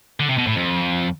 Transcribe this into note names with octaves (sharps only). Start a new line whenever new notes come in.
D3
C3
B2
A2
F2